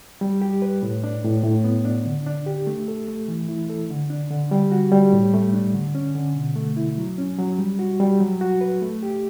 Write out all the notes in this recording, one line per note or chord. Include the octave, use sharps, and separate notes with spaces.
G3
G4
B4
A2
D4
A2
A2
B3
D4
D3
D4
G4
A3
A4
A3
E3
E4
A4
D3
D4
D3
G3
F#4
G3
A2
A3
D4
D3
C#4
D3
B2
A3
E4
F#3
C#4
F#3
G3
F#4
G3
F#3
F#4
B4
A3
G4